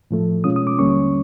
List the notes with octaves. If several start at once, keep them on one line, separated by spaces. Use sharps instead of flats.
A2 F3 A3
B2 G#3 C#4 F4 D#6
D#6
D6
D#2 D3 G3 A#3 C#4 C#6